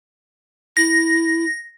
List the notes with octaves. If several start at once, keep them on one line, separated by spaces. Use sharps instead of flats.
E4 A#6